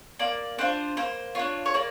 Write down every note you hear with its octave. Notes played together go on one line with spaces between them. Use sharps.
A#3 D5
D4 F4 C5
A#3 C5
D4 F4 C#5
C#5
A#3 D5